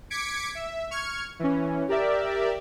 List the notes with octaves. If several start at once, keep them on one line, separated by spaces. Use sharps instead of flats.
D6 G#6 B6 C#7 D7
E5
C#6 F6 G#6 C#7
E3 C#4
G4 A#4 D5 E5